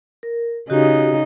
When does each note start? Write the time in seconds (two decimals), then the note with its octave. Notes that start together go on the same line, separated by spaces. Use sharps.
0.23 A#4
0.70 C#3 D#4 F#4 G4